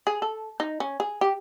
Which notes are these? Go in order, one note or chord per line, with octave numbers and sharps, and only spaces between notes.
G#4
A4
D#4
C#4
G#4
G4